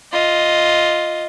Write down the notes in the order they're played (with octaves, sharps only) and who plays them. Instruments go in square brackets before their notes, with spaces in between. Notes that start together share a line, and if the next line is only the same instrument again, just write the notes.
[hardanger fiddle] F4 D#5